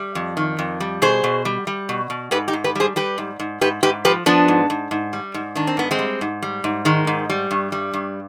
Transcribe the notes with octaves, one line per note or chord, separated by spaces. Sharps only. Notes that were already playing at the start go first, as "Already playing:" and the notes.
Already playing: G3
F2
D#3
F2
G3
B2 G#4 C5
B2
G3
G3
B2
B2
G#2 G4 B4
D#4 G4
G#2
G4 B4
G3 G#4 C5
G3 G4 B4
G#2
G#2
G#2 G4 B4
G#2 G4 B4
F3 G4 B4
F3 B3 D4
G#2
G#2
G#2
G3
G#2
D#3 D4
C4
G#2 B3
G#3 C4
G3
G#2
G3
G#2
D#3 G#3
G#2
G3
G2
G3
G2